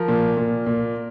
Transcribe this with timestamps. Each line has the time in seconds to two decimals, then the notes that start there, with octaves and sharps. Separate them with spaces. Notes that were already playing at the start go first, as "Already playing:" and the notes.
Already playing: F3 A#4
0.08 A#2
0.37 A#2
0.66 A#2